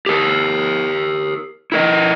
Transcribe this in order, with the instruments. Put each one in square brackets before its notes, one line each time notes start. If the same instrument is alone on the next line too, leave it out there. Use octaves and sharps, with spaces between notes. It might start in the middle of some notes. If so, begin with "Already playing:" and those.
[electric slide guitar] G4 A#4
E4 A#4 D#5